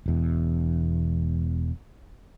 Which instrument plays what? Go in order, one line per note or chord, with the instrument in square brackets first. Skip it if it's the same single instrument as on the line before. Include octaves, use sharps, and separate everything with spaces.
[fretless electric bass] E1 E2